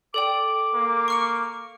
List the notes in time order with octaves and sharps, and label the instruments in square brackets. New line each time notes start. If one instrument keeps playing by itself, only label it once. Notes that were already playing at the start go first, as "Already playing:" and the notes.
[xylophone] A4 D5 G5 [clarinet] D6
[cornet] A#3
[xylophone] C#6 F6 C#7